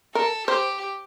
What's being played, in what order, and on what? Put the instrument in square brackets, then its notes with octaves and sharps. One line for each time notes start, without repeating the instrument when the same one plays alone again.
[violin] A4 [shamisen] A#4
[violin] G4 [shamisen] C5